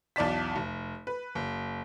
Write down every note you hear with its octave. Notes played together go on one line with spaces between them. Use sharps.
B1 E2 D5 A5 B6
F1
B4
F#1